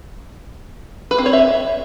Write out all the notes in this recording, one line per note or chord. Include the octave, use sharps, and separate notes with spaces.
B4
C4
C#5
E5